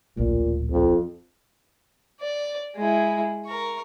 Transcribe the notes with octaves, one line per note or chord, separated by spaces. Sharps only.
D1 A#1 A#2
F2
D5
G#3 E4
A#4 C#6